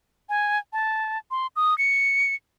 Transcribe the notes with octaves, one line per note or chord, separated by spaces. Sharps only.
G#5
A5
C6
D#6
C#7